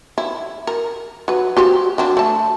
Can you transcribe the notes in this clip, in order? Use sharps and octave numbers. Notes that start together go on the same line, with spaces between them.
E4
A#4
F#3 B4
F#4 G4 C5
F#3 C4 D4
A3 A5